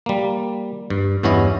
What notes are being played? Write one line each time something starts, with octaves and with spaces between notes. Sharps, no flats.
G3 A#3
G2
E2 G2 B3 C#4 E4 D#5